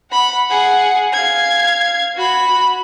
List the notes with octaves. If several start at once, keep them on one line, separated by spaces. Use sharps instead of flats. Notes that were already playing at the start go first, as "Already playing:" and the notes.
F#5 B5
G#4 F#5
F5 G#6
F#4 B5